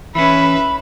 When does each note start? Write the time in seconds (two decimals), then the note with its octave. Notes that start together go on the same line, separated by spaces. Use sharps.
0.15 E3 C#4 B4 E5 B5